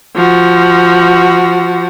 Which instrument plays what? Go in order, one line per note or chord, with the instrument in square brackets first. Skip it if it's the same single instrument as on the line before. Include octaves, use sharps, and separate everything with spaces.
[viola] F3 F#4